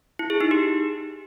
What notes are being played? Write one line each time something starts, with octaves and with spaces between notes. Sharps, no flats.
E4
G#4
D#4
G4